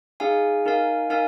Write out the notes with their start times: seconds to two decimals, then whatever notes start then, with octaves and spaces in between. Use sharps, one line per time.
0.20 D#4 G#4 F5 G#5
0.65 D#4 A#4 F5 G#5
1.10 D#4 A#4 F5 G#5